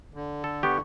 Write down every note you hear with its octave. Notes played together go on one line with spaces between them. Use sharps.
D3
A4
B3 G4 C#6